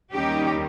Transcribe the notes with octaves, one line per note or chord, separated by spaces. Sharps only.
D#2 D#3 G3 C#4 D#4 G4